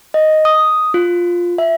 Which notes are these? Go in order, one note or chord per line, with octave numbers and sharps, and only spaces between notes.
D#5
D#6
F4
E5